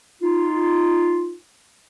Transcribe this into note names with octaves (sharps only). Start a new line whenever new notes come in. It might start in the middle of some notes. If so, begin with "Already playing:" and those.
D#4 F4